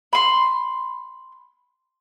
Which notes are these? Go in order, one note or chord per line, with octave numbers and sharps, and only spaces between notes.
B5 C6